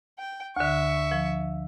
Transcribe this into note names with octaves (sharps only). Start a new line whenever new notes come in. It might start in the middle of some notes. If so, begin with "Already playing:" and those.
G5
D2 D3 E5 C#6
F3